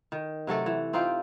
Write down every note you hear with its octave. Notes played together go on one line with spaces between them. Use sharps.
D#3
C3 F#3 A3 A4
E3
C4 D#4 F4 G4